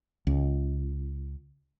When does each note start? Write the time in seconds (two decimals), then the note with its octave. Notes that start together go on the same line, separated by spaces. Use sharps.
0.27 C#2